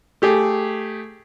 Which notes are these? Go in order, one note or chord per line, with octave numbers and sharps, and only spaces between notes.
A3 G4 G#4